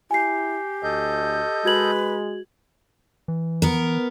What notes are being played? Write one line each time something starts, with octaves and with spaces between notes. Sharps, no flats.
E4 G4 G#5 C7
D2 A4 D#5 G6
G#3 F#4 B4 G#6 F#7
E3
B3 A#4